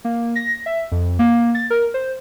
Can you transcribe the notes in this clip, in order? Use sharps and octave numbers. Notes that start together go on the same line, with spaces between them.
A#3
A#6
E5
F2
A#3
A6
A#4
C5